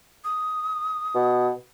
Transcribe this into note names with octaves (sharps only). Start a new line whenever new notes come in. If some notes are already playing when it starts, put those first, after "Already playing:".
D#6
B2